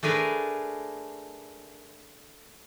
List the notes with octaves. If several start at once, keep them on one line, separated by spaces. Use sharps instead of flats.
A3 D4 G#4 A#4 B4